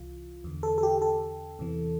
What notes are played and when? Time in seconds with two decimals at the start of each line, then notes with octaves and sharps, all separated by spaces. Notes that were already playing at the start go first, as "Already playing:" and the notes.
Already playing: C2 C3 E3 F4
0.44 E2 D3
0.63 A4
0.78 A4
0.83 G4
0.98 G4
1.02 A4
1.59 E2 C3 E3